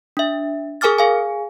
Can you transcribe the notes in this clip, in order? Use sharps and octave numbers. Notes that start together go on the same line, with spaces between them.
D4 E5
G#4 A#4 G#5 D6 F6 A6
G#4 F5 G#5